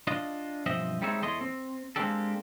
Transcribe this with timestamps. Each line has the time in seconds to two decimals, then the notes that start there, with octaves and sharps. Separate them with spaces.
0.07 D4 F4 D#5
0.66 B1 G2 F3 C4 D#5 E5
1.02 G3 G#3 C4 D#4 C#5 E5
1.22 E2 E4 A4 C#5 D#5 C6
1.41 C4
1.96 G#3 A#3 C4 D4 G4 A4